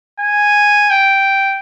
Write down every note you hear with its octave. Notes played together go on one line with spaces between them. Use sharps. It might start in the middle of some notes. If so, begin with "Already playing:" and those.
G#5
G5